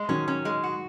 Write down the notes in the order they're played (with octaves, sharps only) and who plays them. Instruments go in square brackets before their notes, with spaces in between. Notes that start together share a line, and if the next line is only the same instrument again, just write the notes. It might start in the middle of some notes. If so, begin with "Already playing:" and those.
Already playing: [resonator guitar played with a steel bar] G#3
[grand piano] D#3 F#3 [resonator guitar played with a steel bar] C#4
[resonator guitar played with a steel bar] C#4
G#3
F#4